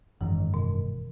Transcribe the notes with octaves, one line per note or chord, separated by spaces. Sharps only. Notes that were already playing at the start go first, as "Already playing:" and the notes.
F#1 G#2 D#3 E3
B2